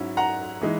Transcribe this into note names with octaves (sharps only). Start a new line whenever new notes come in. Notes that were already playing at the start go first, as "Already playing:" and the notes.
Already playing: G#2 F#3 C#4 E4
F#5 A#5
E3 G#3 D#4